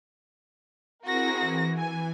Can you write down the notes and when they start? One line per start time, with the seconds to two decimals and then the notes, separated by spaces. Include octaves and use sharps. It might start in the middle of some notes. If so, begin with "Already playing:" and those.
1.04 C4 E4 F#4 G#4 A#4 A#6
1.40 E3
1.77 G#5